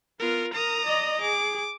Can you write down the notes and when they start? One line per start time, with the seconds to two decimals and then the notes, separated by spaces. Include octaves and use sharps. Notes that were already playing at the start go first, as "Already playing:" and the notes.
0.19 B3 F4 A#4
0.54 A#4 A#5 D#6
0.85 D5 D#5
1.21 G#4 D6